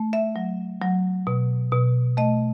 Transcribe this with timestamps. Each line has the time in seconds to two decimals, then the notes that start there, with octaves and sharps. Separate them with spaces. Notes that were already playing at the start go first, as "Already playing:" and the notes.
Already playing: A3
0.13 E5
0.36 F#3
0.82 F#3
1.27 B2
1.72 B2
2.17 A3 D#5